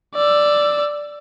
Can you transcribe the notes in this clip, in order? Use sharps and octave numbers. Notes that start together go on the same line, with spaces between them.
D5 E6